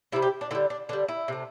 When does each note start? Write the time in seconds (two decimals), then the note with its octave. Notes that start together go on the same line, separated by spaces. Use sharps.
0.12 C3 E4
0.16 G3
0.22 G4
0.41 D4
0.51 D3 E4
0.55 G3
0.70 D4
0.89 D3 D4
0.93 G3
1.08 E4
1.28 C3 A3